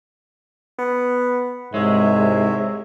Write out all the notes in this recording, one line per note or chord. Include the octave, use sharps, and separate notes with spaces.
B3
C2 G#2 C3 G#3 C#5 E5